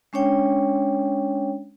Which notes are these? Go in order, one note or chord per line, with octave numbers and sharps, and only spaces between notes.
G#3 C#4 D4 C#5 G5